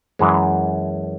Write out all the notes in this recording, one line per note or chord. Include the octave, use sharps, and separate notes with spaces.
F#2 E3 G#3